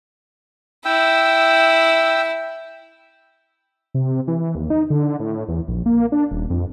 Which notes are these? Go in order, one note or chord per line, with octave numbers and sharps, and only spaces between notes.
E4 G5 E6
C3
E3
D#2
D#4
D3
A2
E2
A#1
A#3
D4
D#1
F2